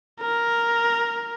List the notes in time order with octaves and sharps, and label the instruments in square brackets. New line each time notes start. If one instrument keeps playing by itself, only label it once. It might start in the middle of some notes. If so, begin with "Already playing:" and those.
[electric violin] A#4